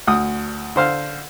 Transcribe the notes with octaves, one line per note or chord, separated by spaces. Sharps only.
D2 D#6
D3 C5 F5